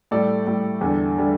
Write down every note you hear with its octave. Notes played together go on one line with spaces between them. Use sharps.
A2 G3 A4 D5
A2 G3
E2 D3 G3
D3 G3